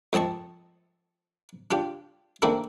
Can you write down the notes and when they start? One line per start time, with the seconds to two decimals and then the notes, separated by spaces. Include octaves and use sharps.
0.13 F2 C4 D#5 A5 C#6
1.71 D4 F4 G4
2.42 D#3 A3 A#3 C4 D4 E4